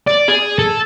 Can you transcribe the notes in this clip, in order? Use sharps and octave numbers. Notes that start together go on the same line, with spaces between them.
D5
G#4
A4